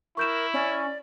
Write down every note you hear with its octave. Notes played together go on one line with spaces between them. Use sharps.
E4 A#4 C#6 G6 E7
C#4 D5